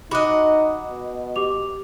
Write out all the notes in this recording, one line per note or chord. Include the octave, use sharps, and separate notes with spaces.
D#4 F#4 D#5 B5 D6 F#6
B2
G4 D6 F7